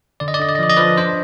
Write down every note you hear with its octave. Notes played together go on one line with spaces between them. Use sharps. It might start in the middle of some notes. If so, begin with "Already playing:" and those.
D3 D5
D#5
D5
D3 D#5
D5
D#5
F3 D5
D#5
F3 B4 D5
D4 C5